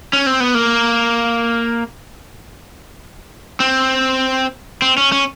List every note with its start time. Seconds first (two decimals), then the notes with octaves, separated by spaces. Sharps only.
0.13 C#4
0.26 C4
0.40 B3
0.55 A#3
3.60 C4
4.82 C4
4.98 C#4
5.12 C#4